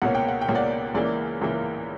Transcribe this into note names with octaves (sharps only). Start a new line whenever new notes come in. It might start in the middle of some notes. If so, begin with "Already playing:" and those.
C#2 B2 A#3 C#4 F#5
G5
F#5
G5
C#2 B2 A#3 C#4
D5 F#5
C#2 C#3 E3 A#3 D5
C#2 C#3 E3 A#3